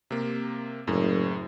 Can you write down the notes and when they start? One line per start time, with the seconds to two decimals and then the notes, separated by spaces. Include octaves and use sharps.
0.11 C3 A#3
0.87 F#1 F#2 A2